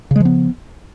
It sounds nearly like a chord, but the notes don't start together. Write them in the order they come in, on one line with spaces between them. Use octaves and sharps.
C#3 G#3 F3 B3